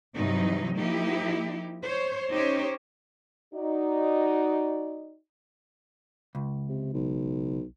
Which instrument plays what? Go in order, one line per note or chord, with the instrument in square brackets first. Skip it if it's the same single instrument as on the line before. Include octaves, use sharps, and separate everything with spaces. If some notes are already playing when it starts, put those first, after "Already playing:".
[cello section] G2 C3 E3 F#3 D#4
F3 A#3 D#4 E4 G4
C5 C#5
C#4 D#4 G4 C5 C#5
[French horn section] D#4 F#4 D5
[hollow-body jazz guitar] C#2
[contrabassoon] C3
B1